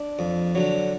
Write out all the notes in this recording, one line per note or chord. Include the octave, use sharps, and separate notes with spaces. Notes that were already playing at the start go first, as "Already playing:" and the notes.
Already playing: D4
F2
D3 F#3